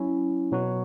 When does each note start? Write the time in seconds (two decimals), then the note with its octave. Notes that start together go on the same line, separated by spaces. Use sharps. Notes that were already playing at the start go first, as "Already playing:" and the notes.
Already playing: F#3 C#4 E4
0.52 B2 F#3 B3 F#4